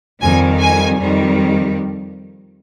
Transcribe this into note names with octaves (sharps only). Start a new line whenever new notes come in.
F2 D#3 G3 G#5
G#5
F2 D#3 G3